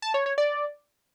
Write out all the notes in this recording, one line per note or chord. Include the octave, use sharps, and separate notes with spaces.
A5
C#5
C#5
D5